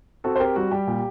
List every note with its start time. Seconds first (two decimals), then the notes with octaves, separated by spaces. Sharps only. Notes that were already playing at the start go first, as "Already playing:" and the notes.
0.24 C4 F#4 A4
0.36 C5
0.40 C4 G4 A#4
0.56 G3 F#4
0.71 G3 G4
0.87 A#2